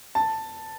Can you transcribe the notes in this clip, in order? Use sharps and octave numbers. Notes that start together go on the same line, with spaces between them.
A5